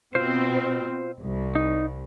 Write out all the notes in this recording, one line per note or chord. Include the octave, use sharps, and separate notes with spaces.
B2 C4 F4 C5
C2
D#4